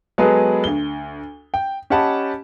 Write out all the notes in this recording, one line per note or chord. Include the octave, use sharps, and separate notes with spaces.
F#3 G#3 B3 G#4 A4 B4
D2 G7
G5
C#4 G4 D#5 F#5 A5 B5